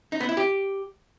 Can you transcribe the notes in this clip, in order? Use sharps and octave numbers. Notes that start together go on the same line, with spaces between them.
D#4
B3
E4
G4